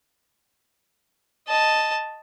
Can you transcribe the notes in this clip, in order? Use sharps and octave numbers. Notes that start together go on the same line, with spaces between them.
D#5 A5